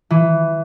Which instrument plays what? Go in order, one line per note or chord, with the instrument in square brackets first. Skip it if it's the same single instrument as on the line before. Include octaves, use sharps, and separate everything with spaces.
[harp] E3